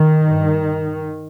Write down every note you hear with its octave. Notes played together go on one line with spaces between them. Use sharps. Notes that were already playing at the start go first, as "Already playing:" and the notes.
Already playing: D#3
G2